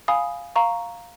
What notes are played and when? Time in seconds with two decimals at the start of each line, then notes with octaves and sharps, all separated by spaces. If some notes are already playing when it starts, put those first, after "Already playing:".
0.08 F5 G#5 B5 D#6
0.56 F5 A#5 C#6